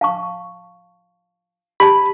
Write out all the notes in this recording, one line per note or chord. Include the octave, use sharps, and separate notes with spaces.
F5 A5 C#6
G4 D5 A5 B5